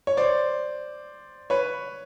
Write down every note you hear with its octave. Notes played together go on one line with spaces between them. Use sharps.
C#5
C5 D5
B4 C#5